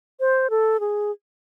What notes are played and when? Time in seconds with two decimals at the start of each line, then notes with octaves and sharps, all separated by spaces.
0.20 C5
0.50 A4
0.80 G#4